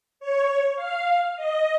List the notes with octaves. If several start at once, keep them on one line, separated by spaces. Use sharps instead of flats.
C#5
F5
D#5